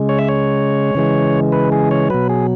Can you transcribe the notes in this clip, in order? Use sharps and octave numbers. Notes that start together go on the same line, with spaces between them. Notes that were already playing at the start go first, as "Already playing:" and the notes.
Already playing: C#3 G#3
C#5
E5
C#5
C#3 E3 G#3
B4
G#4
C#5
B2 F#3 B4
G#4